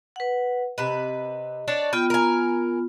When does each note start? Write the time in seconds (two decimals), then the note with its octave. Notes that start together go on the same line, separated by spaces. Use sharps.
0.16 B4 F#5
0.78 C3 B4 D#5
1.68 D4 C#5 D5
1.93 B3 F4 G5
2.10 A#4 G#5